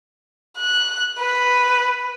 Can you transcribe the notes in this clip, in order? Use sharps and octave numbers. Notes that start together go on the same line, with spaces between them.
F#6
B4